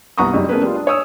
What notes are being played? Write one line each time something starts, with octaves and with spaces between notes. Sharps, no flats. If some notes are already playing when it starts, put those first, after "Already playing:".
C2 B3 F#5 A#5 C#6 D#6
F#2 G3 G#3 D#4
A3 B3 C#4 G#4 A#4 B4
G3 F4
D4
C#5 G#5 D#6 E6